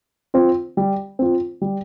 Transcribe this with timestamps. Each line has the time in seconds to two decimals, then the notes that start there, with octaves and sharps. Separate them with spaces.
0.34 C4 F4
0.77 G3
1.19 C4 F4
1.62 G3